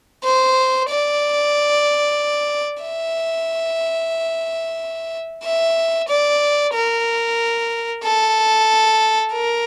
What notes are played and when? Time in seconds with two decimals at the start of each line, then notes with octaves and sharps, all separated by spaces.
0.24 C5
0.89 D5
2.83 E5
5.43 E5
6.08 D5
6.73 A#4
8.03 A4
9.33 A#4